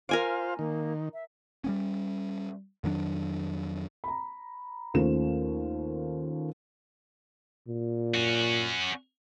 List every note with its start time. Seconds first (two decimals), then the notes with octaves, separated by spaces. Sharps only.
0.09 F4 A#4 C5 F5 G#5 D6
0.59 D#3 A#3
1.14 E5
1.64 G3 B3 C#4
2.84 F2 D#3 F#3 D4
4.04 A#5 B5
4.94 D#2 A3 C#4 F4 C5 E7
7.68 A#2
8.14 C#4 F#4